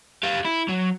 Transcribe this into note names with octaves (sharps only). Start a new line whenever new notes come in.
G4 F5
E4
F#3